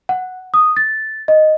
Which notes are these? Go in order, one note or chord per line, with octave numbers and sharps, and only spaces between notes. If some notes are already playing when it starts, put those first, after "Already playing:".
F#5
D#6
A6
D#5